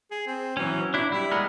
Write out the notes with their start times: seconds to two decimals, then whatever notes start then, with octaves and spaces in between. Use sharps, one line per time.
0.11 G#4
0.27 C4
0.57 E3 F#3 C#4
0.94 F#3 D4 E4
1.12 G3 E4
1.32 G#3 B3 A#4